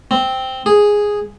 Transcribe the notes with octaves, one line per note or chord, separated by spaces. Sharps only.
C4
G#4